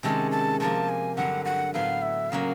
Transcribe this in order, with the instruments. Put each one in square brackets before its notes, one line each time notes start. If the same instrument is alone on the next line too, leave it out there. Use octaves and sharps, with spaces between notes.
[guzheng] C3 D#3 G#3 C#4 [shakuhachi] A5
[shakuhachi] A5
[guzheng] C3 F3 A#3 [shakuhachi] A5
[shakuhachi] G#5
[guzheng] G2 D3 F#3 [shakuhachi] F#5
[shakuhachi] F#5
[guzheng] A2 F#3 B3 [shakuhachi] F5
[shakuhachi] E5
[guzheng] C#3 F#3 A#3 C#4 [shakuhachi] F5